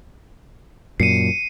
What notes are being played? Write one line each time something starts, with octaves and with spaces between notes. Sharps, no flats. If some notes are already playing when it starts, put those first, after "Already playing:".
F#2 A#2 C7 C#7 D#7